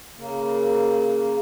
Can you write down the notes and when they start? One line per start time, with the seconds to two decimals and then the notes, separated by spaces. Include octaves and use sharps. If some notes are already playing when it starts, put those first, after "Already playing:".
0.18 C#3 A#3